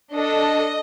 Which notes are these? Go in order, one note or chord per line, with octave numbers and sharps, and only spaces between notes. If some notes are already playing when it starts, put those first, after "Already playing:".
D4 A4 D#5